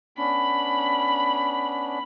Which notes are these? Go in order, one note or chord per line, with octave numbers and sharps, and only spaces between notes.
B3 C#4 D4 B5